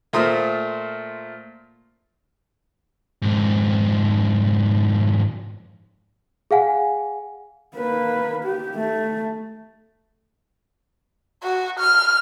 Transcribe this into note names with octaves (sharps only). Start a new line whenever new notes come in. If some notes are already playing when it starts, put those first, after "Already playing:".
A#2 A3 F4 A#4 C5 D#6
F2 G#2
G#4 F5 F#5 G#5
A#3 B4
G4
A3
F#4
F6